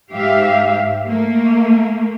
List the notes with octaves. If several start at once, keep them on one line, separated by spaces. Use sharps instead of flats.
G#2 G4 E5 F5
A3 A#3